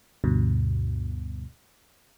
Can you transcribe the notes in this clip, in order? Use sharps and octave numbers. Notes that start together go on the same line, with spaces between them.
D2 G2 B2